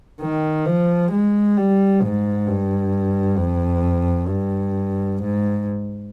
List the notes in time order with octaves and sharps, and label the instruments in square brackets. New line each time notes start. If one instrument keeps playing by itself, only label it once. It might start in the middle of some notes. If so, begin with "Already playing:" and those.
[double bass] D#3
F3
G#3
G3
G#2
G2
F2
G2
G#2